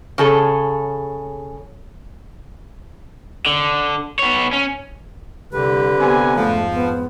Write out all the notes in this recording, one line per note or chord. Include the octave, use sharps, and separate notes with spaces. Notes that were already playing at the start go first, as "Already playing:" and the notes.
C#3 G#4 A4 C#5
D3
B3 C#5
C#4
C2 D3 G4 B4
C3 B3 G#5
F2 G#2 F3 A3
B3